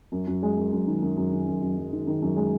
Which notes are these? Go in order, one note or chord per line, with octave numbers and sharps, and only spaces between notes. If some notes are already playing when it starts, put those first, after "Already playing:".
F#2
F#2
G#3
F#2
F#2
D#3
F#2
F#2
D#3
F#2
F#2
F#2
D#3
D#3
F#2
G#3